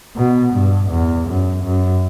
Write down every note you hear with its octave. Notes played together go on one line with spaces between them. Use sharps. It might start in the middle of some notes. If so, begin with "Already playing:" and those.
B2
G2
E2
F#2
F#2